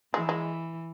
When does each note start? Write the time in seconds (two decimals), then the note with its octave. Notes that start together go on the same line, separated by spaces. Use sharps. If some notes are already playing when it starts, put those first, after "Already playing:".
0.14 E3 G#3
0.29 G#3